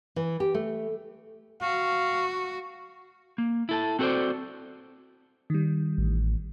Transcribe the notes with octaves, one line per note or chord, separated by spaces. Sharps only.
E3
G4
A3
F#4 F5
A#3
E4 A4 A5
C4 F#4 A4 B4 C5 D5
D#3 G3
A1